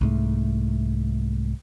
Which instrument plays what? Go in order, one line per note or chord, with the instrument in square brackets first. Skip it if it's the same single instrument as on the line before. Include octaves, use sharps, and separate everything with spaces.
[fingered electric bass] C2 G#2 A3